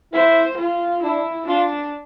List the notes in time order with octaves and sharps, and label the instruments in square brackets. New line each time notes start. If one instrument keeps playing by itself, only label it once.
[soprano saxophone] E4 [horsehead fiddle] C5
[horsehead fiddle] F4
[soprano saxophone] D4 [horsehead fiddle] E4
[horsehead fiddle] D4 [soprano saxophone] F4